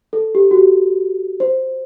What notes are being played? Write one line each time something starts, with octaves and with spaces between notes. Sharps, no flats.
A4
G4
F#4
G4
C5